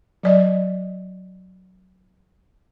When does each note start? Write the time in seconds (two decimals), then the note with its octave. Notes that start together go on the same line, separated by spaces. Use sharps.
0.23 F#3 D5 D#5